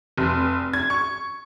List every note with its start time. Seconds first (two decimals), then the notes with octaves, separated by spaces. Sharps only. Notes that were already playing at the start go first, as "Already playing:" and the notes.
0.18 F1
0.73 G#6
0.90 C#6